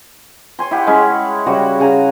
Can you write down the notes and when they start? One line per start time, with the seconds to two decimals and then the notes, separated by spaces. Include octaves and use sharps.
0.59 C#5 G#5 C6
0.71 E4 G4 F#5
0.87 G#3 C#4 E4
1.10 C#6
1.46 C#3 G3 F#4 C#5
1.80 C#3 G#5 A#5